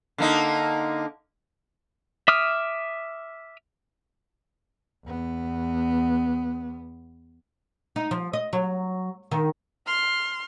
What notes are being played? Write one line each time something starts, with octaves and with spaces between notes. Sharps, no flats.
D3 A#3 D#4
E5 D6 D#6 F6
E2 B3
D#4
F3
D#5
F#3
D#3
C6 F6